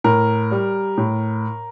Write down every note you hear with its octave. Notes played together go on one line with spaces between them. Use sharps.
A2 A#4
G3
A2